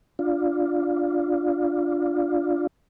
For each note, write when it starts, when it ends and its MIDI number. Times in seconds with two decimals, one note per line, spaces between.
0.19 2.67 62
0.19 2.67 65